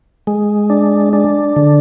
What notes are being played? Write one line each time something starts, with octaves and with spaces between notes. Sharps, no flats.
G#3
D4
D4
D3